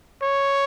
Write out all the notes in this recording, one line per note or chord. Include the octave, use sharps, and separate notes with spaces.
C#5